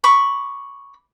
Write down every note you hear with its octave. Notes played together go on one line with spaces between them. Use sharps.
B5 C#6 D6